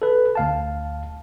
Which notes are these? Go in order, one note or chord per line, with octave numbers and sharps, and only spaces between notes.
A4 B4
D2 F5 A5